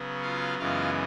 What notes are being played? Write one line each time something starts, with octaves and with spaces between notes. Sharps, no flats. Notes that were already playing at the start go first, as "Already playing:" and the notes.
Already playing: C#3 F#3 B3
F4 F5
F#2 C#3 E3 G#3 B3 F4 F5